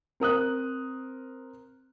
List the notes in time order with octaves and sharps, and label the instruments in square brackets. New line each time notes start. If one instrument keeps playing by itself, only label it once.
[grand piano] C4 A#4 D#6 F#6